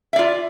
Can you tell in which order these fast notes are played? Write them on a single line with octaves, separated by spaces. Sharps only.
E5 D5 F4